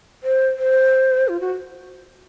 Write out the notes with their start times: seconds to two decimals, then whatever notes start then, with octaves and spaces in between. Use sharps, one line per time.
0.24 C5
0.59 C5
1.28 F4
1.40 F#4